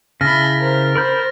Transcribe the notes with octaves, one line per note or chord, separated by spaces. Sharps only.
C#3 E4 A5 B5 F6 A6 A#6
A#4 C5
A#4 C5 B5 G6